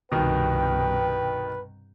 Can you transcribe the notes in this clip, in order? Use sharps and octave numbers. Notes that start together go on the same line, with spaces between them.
C2 G2 B2 D#3 B4 G5